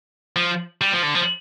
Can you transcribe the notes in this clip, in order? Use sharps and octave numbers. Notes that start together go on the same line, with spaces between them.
F3
G3
F3
D3
F3